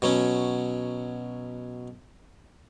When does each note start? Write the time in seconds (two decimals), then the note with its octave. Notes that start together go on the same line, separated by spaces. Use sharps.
0.02 B2 F#3 C#4